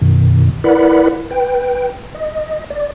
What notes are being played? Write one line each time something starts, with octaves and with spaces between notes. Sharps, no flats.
F#2 B2 D#3
E4 A#4 B4 D5 F#5 B5
B4 G5
D#5
D5